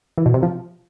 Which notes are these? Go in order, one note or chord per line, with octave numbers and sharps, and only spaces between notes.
E3
B2
C3
F3